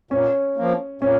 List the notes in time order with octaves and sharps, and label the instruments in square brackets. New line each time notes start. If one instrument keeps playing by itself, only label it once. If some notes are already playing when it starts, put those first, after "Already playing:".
[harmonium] A#2 [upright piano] C#4
[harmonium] F3 A#3
[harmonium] A#2 [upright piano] C#4